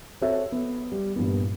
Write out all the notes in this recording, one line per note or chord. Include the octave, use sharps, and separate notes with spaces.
C4 F#4 A4 C#5 E5
B3
G3
G2 A#2 E3 B3